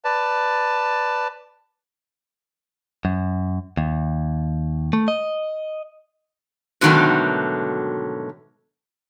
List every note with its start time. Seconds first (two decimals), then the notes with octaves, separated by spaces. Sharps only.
0.04 B4 D5 A5
3.05 F#2
3.77 D#2
4.93 A3
5.08 D#5
6.81 G#2 B2 D3 D#3 F#3 A3